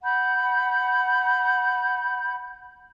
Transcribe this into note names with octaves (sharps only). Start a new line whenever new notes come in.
F#5 B5 G6